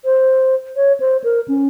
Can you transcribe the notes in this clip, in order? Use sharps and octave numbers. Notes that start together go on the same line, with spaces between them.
C5
C#5
C5
A#4
C#4